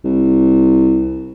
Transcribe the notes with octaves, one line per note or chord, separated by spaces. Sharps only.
C2